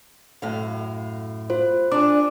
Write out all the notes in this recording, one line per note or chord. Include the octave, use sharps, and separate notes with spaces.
F#2 A2 F5
F4 C5
D4 G#4 D6